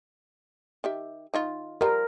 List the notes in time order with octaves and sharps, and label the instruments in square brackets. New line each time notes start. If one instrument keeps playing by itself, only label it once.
[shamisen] D#3 G4 E5
D#3 D#4 F4
[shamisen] F3 G3 F4 [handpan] A#4